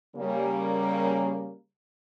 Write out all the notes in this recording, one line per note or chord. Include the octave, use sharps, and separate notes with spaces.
C#3 G3 A#3